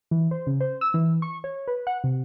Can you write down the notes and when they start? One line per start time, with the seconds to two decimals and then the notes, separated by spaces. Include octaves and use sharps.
0.11 E3
0.31 C5
0.47 C#3
0.60 C5
0.81 E6
0.94 E3
1.22 C#6
1.44 C#5
1.67 B4
1.87 F#5
2.04 C3